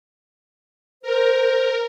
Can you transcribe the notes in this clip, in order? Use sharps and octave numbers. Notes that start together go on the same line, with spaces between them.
A#4 C5